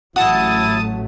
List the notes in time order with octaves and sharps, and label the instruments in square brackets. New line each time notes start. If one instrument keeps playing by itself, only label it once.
[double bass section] A1 F#3 A3 [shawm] E4 [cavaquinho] F#4 [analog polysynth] A5 D#6